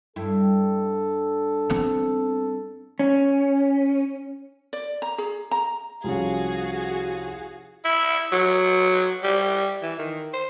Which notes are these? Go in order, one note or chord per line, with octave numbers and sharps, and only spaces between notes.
G2 E4 A4
B3 C4
C#4
D5
A#5
G#4
A#5
C2 F3 C#4 F#4 G#4 F5
E4
F#3
G3
E3
D#3
C5